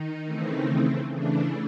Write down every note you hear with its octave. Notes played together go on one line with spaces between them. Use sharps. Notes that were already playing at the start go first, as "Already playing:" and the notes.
Already playing: D#3 D#4
C#3 E3 A3 C4
C#3 E3 A3 D4